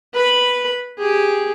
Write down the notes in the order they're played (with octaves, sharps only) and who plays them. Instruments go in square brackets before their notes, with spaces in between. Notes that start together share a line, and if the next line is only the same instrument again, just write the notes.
[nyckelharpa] B4 B5
G4 G#4